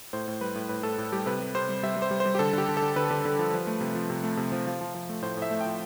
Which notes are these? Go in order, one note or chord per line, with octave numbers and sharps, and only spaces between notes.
A2 C5
A2
G3 B4
A2
A2 B4
A2 A4
A2
G3 G4
C3 B4
G3
C3 C5
G3
G3 E5
G3
C5
G3
C5
G3
G4
D3 A4
D3 G4
D3
A4
D3
D3 B4
D3
D3
F3
F3
A3
C3
F3
C3
A3
C3
F3
F3
F3
F3
A3
A2 C5
A2
E5
A3
G5
F3